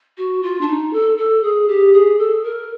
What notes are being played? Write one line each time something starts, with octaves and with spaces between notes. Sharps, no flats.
F#4
F4
D4
D#4
A4
A4
G#4
G4
G#4
A4
A#4